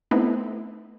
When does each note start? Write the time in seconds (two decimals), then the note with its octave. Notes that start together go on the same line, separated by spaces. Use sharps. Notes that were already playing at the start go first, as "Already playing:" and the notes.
0.11 A3 B3 C4 D#4 E4